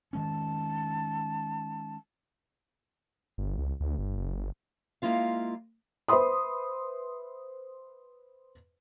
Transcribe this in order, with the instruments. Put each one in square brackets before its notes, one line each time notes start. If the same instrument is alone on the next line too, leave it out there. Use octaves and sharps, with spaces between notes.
[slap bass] D#3 G#3 C#4 [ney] A5
[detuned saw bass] G1
C#2
D2
G1
F#1
G1
[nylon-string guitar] G#3 A#3 E4 F4 F5
[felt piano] B4 C5 E5 B5 C6 D#6